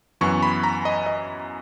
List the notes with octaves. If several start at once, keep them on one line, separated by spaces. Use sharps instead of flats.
F#2 E3 B3 C#6
B5
A#5
D#5
D#5